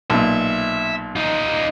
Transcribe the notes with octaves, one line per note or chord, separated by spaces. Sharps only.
B1 A#2 E5
D#4 F4